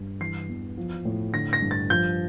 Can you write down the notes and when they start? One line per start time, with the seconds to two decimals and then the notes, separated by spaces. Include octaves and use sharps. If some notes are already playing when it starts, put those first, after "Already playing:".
Already playing: G2
0.20 E3 C7
0.49 E2
0.78 F3
1.05 A2
1.33 D3 A#6
1.53 A#6
1.62 G2
1.71 A6
1.90 F3 G6